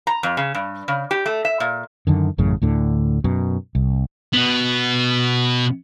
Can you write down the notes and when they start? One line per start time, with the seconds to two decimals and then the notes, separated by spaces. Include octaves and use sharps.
0.07 A#5
0.23 F2
0.37 C#3
0.55 G2
0.88 C#3
1.11 G4
1.26 A3
1.45 E5
1.60 A#2
2.07 F#2 D3 D#3
2.38 A1 F#2 A2 C#3
2.62 D2 A2 D3
3.24 F#2 B2
3.75 C2
4.33 B2 B3